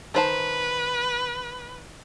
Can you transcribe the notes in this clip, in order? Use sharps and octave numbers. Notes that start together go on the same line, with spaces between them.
D#3 B4 C5 A5